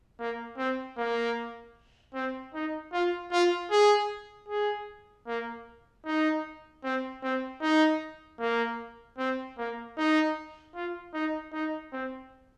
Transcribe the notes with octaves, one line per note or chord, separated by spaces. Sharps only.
A#3
C4
A#3
C4
D#4
F4
F4
G#4
G#4
A#3
D#4
C4
C4
D#4
A#3
C4
A#3
D#4
F4
D#4
D#4
C4